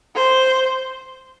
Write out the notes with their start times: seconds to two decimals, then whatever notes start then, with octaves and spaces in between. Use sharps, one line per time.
0.16 C5